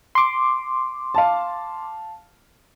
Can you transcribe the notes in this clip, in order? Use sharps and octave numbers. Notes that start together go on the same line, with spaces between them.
C6 D6
F5 A5